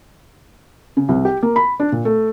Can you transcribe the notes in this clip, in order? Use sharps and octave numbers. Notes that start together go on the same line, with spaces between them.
C#3
C2
G4
A#3
B5
D4
A#2
A3